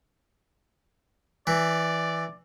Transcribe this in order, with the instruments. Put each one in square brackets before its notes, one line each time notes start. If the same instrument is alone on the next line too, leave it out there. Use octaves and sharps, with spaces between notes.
[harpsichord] E3 [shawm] D5